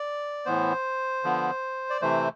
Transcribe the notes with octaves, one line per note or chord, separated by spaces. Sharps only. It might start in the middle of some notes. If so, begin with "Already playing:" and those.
Already playing: D5
A2 E3 B3 C5
D3 F3 B3
D5
C3 E3 A3 C5